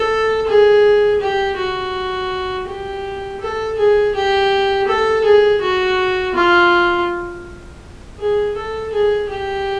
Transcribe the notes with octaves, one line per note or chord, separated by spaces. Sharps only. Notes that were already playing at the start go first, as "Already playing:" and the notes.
Already playing: A4
G#4
G4
F#4
G4
A4
G#4
G4
A4
G#4
F#4
F4
G#4
A4
G#4
G4